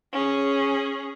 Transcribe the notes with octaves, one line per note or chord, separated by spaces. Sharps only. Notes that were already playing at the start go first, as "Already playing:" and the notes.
C#4 G#4